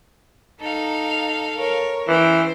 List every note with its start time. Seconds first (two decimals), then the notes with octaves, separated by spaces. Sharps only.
0.61 D#4 A4 F5
1.56 A#4 C#5
2.08 E3 C#4 C5 G5